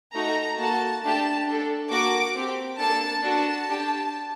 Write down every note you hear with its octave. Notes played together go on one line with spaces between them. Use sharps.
A3 D#4 F#4 A4 A#5
A#3 F#4 A4 A5
A3 D4 G4 A5
D4 A4
A#3 F#4 A4 D6
C4 G4
A#3 D4 A4 A5
D4 F#4 A4 A5
D4 G4